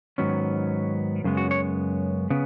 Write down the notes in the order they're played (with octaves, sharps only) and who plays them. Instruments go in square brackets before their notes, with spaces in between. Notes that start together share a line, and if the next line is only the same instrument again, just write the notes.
[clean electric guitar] G#2 D#3 F#3 B3 C#4
F#2 C#3 G#3 B3
F#4
C#5
C#3 B3